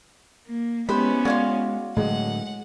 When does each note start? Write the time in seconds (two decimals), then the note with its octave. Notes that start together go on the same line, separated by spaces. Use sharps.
0.46 A#3
0.89 G#3 B3 C#4 E4 G4 B4 C5 B5
1.25 G#3 F#4 D5 F5 C6 G#6
1.97 A2 D3 F#3 G#3 F#5